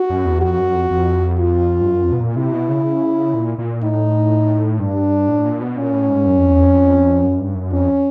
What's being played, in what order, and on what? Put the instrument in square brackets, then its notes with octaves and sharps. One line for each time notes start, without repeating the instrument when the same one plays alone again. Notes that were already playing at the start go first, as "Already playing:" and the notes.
Already playing: [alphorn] F#4
[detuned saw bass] F#2
E2
[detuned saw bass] F2 [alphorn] F#4
[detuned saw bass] F#2
F2
F2
[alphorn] F4
[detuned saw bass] G2
F#2
F2
B2
A#2
[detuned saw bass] C3 [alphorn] E4
[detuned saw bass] B2
C#3
A#2
A#2
[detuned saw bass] A2 [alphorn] D#4
[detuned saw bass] G2 [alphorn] D4
[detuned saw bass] A2
A#2
B2
[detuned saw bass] A#2 [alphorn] C#4
[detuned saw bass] A2
G#2
F#2
F2
E2
F2
F#2
G2
F#2
[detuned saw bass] F2 [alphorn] C#4